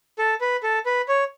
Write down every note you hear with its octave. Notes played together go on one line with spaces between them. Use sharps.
A4
B4
A4
B4
C#5